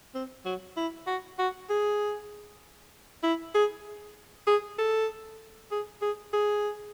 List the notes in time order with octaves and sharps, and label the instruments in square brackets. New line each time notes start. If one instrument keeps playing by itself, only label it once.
[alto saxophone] C4
F#3
E4
F#4
F#4
G#4
E4
G#4
G#4
A4
G#4
G#4
G#4